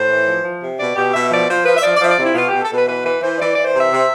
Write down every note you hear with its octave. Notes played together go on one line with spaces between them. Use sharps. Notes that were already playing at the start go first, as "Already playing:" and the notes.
Already playing: A2 C5
E3
F3
F3
C3
B2 D5
B2 G4
B2 E5
F3 D5
F3 C5
F3 B4
E5
F3 D5
D5
F3 E5
D5
C3 E4
B2 F4
B2 G4
A4
B2 B4
E3 B4
E3 B4
E3 C5
E3 D5
E3 D5
C5
C3
E5
C3